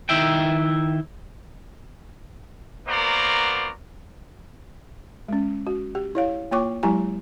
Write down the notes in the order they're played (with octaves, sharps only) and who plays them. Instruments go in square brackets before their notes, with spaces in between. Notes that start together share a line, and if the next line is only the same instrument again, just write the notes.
[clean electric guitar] D#3 E4 E5 G5
[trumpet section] A#3 B3 F#4 A#4 C5 D5
[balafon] G#3 C#4
F#4
G4
E4 C#5 F5
A#3 F4 C#5 G5 C#6 D6
F#3 G#3 E4 G4 G#5 A#5